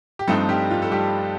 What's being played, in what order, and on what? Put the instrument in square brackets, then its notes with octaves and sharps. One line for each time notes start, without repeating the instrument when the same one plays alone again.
[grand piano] G4
G2 F3 A3 C4 D#4 A4
G3 G4
F4
A4
G3 G4